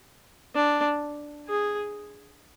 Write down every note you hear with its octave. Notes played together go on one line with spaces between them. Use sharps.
D4
G#4